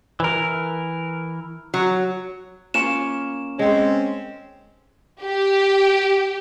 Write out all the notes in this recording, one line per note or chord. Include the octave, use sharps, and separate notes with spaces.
E3 A#4
F#3
A#3 C#4 F4 E7
G#3 C4 C#4
G4